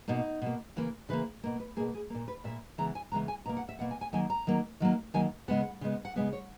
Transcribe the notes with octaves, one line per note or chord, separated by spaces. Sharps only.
B2 A#3 D#4
B2 A#3
C#3 E3 A#3
C#3 E3 A#3 B4
B2 A#3
B4
B2 A#3 G#4
G#4
A#2 A#3
B4
A#2 A#3 E5
C#3 E3 G#3 B3 A#5
G#5
C#3 E3 G#3 B3 A#5
G#5
B2 A#3 A#5
F#5
E5
B2 A#3 F#5
G#5
G#5
D#3 F#3 A#3 G#5
A#5
D#3 F#3 A#3
D#3 F#3 A#3
D#3 F#3 A#3 G#5
C#3 G#3 B3 F#5
C#3 G#3 B3
F#5
C#3 E3 G#3 B3 E5
C#5